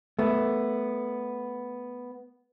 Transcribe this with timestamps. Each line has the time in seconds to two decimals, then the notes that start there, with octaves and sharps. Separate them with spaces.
0.19 A3 B3